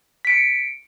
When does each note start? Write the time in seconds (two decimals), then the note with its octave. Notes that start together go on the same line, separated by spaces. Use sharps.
0.25 B6
0.27 D7
0.30 C#7